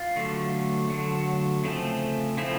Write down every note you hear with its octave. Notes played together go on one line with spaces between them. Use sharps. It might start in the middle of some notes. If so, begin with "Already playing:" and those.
Already playing: F4
D3 F#3 A3
D3 F#3 A3
C#3 F3 A3 C4
C#3 F3 A3 C4 E4